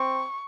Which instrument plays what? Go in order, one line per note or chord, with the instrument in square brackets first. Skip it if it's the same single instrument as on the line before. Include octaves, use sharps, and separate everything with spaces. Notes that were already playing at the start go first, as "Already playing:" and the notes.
Already playing: [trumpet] C4 [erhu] C#6